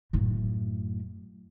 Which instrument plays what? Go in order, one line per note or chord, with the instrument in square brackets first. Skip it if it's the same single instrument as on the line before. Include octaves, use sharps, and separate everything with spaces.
[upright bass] F#2 A2